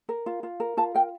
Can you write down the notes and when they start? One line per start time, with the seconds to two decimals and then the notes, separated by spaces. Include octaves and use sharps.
0.09 A#4
0.26 F4
0.43 F4
0.60 A#4
0.77 F4 A5
0.94 A#4 G5